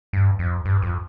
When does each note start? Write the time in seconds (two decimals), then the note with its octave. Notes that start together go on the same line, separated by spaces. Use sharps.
0.13 G2
0.39 F2
0.65 G2
0.82 F2